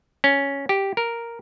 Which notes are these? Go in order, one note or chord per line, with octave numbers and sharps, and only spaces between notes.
C#4
G4
A#4